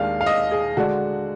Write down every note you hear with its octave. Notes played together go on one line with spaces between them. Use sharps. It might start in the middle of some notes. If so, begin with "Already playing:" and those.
Already playing: D#2 D#3 G#3 D4 F5
F5
D#5
G#4
D3 G#3 D4 F#4